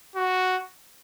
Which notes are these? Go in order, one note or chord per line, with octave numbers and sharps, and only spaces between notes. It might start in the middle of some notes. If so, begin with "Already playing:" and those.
F#4